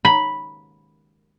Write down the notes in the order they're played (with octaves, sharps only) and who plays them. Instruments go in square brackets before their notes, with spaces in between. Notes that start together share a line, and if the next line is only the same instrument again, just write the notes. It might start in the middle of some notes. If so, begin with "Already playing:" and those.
[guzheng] B5